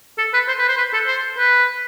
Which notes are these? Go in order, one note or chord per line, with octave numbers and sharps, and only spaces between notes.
A4
B4
C5
B4
C5
B4
A4
C5
B4